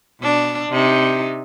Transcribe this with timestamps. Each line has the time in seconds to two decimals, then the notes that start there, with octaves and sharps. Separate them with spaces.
0.20 B2 D4
0.69 C3 D#4